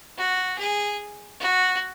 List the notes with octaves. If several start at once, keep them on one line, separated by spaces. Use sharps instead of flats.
F#4
G#4
F#4